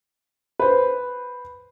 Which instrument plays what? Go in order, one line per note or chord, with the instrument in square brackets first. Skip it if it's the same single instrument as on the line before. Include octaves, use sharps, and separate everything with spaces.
[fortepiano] B4 C5